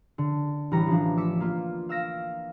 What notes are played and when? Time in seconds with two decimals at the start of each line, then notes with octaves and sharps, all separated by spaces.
0.18 D3
0.71 A1 E3 G3 B4 A#5 C#7
0.87 F3 D4
1.17 D6 E6 B6 C#7
1.40 A#3 F4
1.89 F5 E6 F6 A#6 D7